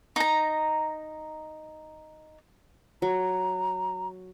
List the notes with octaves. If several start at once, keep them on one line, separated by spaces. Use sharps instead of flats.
D#4 A#5
F#3 A#5